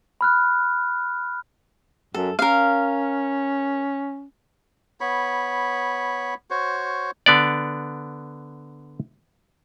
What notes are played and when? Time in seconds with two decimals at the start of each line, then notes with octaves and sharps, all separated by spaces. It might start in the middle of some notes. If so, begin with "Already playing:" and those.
0.21 B5 F6 F#6
2.14 F#2 A4
2.39 C#4 A#4 F5
5.01 B3 C#5 B5
6.50 F#4 C5 C#5
7.26 D3 B3 D5